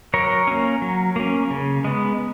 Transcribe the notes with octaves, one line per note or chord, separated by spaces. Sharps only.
F#3 A#4 C#5
A#3 C#4
F#3
A#3 C#4
C#3
G#3 B3